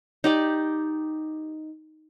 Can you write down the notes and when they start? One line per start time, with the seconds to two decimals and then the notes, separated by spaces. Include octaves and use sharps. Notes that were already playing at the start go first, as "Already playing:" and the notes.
0.24 D#4 G4 D5